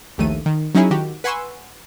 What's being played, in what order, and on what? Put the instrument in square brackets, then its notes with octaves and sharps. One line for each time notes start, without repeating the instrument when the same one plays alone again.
[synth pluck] A#1 D#2 A3 D#7
D#3
F#3 C#4 D#4 E4 G#4 C#5
D#3 F#4 G4
B4 F#5 G#5 C6 C#6 E6